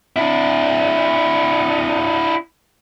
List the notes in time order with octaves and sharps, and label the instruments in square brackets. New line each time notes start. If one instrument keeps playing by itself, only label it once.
[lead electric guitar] D4 E4